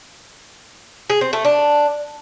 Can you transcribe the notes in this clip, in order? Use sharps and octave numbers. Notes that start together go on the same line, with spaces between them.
G#4
C4
A3
D4